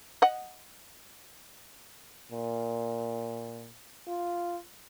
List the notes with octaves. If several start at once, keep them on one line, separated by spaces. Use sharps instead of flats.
D#5 F#5
A#2
F4